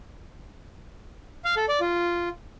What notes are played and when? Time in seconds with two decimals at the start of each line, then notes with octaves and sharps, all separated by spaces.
1.45 F5
1.57 A4
1.69 D5
1.81 F4